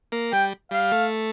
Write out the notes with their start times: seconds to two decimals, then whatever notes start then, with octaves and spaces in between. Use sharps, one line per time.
0.12 A#3
0.33 G3 G5
0.71 G3 F5
0.92 A3